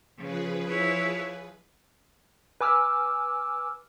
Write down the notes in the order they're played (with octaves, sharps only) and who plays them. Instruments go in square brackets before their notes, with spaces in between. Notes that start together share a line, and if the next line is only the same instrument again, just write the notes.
[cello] C#3 [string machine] F3 G#4 B4
[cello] E4 C#5
[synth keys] B4 G#5 D6 E6 F6